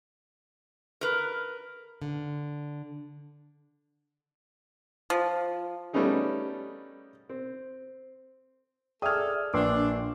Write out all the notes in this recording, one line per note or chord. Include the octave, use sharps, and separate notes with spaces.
A#4 B4
D3
F3
G3 A3 B3 C#4 D#4 G#4
C4
G#4 A4 D5 E5 G5 D#6 F6 G#6
A#1 D4 B4 G5 C6 D6 E6 C7